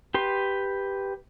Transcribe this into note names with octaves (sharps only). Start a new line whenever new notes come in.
G4 B4 C6